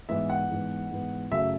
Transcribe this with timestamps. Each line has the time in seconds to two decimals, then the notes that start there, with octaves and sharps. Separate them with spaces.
0.09 G#2 E3 B3 E5
0.30 F#5
0.50 G#2 E3 B3
0.91 G#2 E3 B3
1.31 F#2 C#3 F#3 A3 E5